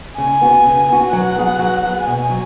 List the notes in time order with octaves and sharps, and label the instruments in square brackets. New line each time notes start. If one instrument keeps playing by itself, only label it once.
[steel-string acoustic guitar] C#3 [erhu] G#5
[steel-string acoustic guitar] B3 F#4
C#3
B3 F#4
[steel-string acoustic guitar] F#3 [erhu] F#5
[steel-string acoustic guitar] B3 G#4
F#3
B3 G#4
[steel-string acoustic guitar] B2 [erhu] G#5
[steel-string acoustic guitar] F#3